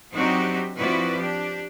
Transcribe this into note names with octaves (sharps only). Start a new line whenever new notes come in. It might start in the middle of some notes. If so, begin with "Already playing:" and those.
F#3 C4 D4 D#4 F#4 G4
F3 C4 E4 F#4 B4 D5
D4 G4